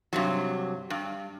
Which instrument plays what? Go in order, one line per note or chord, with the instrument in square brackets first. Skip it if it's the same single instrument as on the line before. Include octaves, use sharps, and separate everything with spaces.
[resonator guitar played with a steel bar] G2 C3 F#3
G2